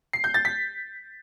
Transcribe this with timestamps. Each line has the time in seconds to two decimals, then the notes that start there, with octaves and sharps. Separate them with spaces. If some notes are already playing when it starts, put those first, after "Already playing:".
0.13 C7
0.24 G6
0.34 A6
0.45 B6